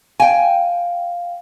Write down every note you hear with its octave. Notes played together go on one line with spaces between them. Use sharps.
F5 G5 G#5